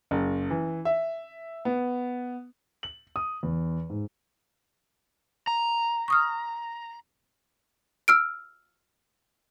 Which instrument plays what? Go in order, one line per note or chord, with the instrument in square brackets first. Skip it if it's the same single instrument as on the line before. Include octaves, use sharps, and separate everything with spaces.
[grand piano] F#1
E3
E5
B3
F#7
D#6
E2
G#2
[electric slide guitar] A#5
[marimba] C#6 D#6 F6
[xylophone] E6 F6 D7